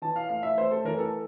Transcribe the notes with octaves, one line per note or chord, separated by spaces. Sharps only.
E3 A5
F5
A3 F5
E5
A3 C5
A4
E3 A#4
A4